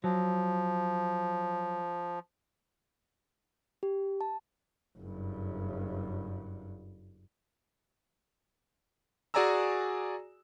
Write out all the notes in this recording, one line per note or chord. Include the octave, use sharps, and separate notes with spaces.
F3 F#3
G4
A5
F#1 G2
F#4 G#4 D5 G#5 A#5 E6